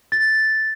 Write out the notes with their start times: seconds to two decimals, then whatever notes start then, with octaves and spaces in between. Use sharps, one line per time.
0.12 A6